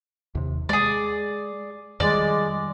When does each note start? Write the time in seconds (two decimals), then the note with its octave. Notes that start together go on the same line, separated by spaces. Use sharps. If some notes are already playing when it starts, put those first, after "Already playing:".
0.35 D#2 C3
0.69 G#3 G#4 D5
2.00 F2 D#3 G3 G#3 D5